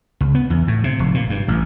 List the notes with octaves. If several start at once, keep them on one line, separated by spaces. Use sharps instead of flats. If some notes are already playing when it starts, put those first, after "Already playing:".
C#2
B3
E2
A2
C3
F1
A#2
G2
A1